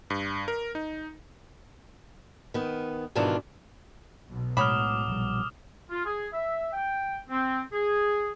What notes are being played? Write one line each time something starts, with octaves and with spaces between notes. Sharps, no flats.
G2
A#4
D#4
D#3 B3
G#2 B2 D#3 E3 D4 F4
B1 B2
A2 F#3 G#3 B5 D6 D#6 F6
A#1 G3
F4
G#4
E5
G5
C4
G#4